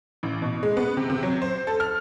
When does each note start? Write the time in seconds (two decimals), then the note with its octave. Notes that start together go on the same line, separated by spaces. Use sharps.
0.23 A1
0.42 B2
0.63 G#3
0.77 B3
0.97 C3
1.10 C3
1.23 F#3
1.42 C5
1.67 A4
1.80 F6